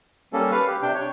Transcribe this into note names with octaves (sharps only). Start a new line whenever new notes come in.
G3 A#3 C#4 A4
B4 F5
G4
C3 D4 G5
C#5